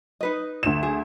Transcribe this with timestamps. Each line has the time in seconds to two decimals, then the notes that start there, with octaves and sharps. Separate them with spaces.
0.21 D#4 B4 D#5
0.63 D2 E7
0.83 G#4